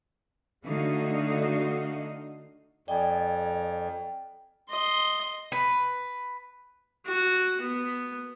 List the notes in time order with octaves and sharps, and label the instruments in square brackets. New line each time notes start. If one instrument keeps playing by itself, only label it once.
[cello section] D3 A3 D#4 F#4 D#5 F5
[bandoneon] F2 [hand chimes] D5 D#5 G#5 [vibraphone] G5
[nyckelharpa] D#5 C6
[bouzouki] B4
[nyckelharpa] F#4
B3